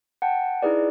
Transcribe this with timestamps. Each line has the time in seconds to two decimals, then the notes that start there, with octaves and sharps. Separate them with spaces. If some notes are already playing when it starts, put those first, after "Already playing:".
0.22 F#5 G5 A5
0.62 D#4 E4 G#4 B4 D5